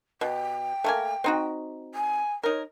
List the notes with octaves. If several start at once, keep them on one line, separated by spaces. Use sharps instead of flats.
B2 G5
A3 A#3 G#5
C4 D#4 F#4
G#5
D#4 A#4 C#5